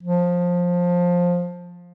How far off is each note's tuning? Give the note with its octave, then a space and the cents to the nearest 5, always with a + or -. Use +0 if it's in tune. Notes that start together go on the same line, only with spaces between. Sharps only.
F3 +15